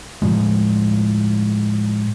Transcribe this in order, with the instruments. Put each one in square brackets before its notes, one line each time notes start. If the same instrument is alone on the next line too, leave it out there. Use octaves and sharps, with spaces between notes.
[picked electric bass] A2 F3 G#3